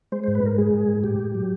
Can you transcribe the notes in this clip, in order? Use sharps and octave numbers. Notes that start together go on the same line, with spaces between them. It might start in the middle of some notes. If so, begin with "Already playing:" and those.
G#3 C5
G#2 C5
B4
G#2 A#4
G#3 G#4
G#2
G#2
A2 G4
A2
F#3